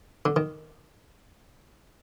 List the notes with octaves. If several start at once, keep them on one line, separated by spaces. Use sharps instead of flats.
D3
D#3